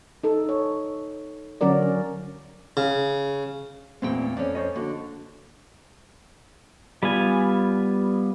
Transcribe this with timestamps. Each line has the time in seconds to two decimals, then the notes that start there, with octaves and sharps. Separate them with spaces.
0.23 D#4 A4
0.49 C#5
1.61 D3 F#3 C#4 F#4 A#4 D5
2.77 C#3
4.02 E2 A#2 A3 C4 G5
4.37 F2 C#4 D5
4.55 C5 C#5 D#5
4.75 D3 A#3 F#4
7.03 G3 B3 F4 G#5